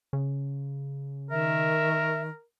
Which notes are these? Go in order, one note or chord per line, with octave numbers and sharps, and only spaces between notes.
C#3
D#3 A#4 E5